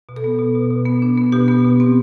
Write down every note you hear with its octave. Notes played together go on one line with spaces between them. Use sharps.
B2
A4
B3
B2
B2
B2
B3
D4
B3
B2 G4
B3
B2
C4